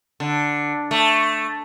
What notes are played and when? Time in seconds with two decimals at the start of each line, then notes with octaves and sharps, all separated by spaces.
0.20 D3
0.91 A3